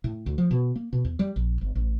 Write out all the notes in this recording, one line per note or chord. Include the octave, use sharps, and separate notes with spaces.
A2
D2
F3
B2
A#3
B2
E2
G3
A#1
G1
A1